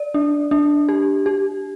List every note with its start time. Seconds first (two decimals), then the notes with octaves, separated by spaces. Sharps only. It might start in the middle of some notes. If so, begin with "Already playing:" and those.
Already playing: D5
0.14 D4
0.51 D4
0.89 G4
1.26 G4